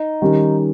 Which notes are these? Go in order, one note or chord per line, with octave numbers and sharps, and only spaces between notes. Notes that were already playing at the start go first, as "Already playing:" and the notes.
Already playing: D#4
D#3 G3 C#4 G4